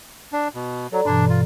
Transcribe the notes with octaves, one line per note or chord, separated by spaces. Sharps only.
D4
B2
F#3 A4 D5 A#5
G2 B2 E3 D4
F4